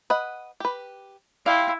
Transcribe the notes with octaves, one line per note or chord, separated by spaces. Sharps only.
B4 D#5 F#5
G4 B4
E4 G4 D5 F5 G5 C6